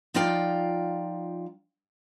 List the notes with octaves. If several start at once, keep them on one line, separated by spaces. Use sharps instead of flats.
F3 D#4 F4 D5 F5 G5